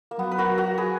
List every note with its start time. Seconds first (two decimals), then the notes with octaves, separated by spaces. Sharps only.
0.11 A#3
0.19 F#3 B3
0.31 B4
0.38 F#4 A#4
0.58 F#4 A#4
0.78 G#4 B4